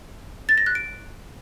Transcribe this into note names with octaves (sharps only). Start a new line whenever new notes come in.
A6
A#6
F#6
D7